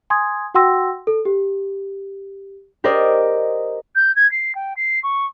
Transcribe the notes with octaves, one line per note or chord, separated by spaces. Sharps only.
G#5 C6 D#6 G#6
F#4 F#5 G5 C6 E6 A#6
A4
G4
G4 A#4 C5 D5 D#5
G6
G#6
C7
G5
C7
C#6